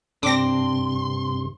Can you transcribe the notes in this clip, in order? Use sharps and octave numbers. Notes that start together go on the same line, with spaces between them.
G2 C3 C4 D4 C6 D6 A#6